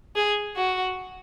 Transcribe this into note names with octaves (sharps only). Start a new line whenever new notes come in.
G#4
F#4